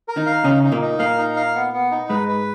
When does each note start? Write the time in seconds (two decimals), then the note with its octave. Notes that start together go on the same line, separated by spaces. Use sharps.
0.08 A#4
0.16 D#3 D#4
0.26 F5
0.44 C#3 C#4 D#4
0.63 D#4
0.72 A#2 A#3
0.81 D#4
0.99 A#2 A#3 F5
1.18 D#4
1.36 F5
1.55 B3
1.73 B3
1.91 D#4
2.09 G#2 G#3 B4
2.28 B4